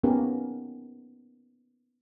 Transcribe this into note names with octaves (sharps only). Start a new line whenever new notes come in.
A#3 B3 C#4 D#4 G4 A#4